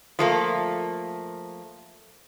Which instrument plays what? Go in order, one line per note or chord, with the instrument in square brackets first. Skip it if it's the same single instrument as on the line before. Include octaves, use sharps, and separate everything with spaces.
[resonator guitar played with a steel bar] F3 A3 A#3